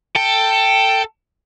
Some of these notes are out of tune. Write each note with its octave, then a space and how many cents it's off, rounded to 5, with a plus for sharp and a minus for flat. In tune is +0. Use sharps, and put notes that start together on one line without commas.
A4 +15 G5 +0